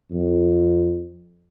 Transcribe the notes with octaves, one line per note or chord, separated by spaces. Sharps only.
F2